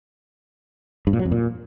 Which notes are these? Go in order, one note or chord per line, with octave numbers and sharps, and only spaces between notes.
G2
A#2
F#3
F2
A#2